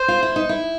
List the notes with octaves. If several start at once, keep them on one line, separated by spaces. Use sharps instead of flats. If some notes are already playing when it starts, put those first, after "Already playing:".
Already playing: C5
F4
E4
D#4
E4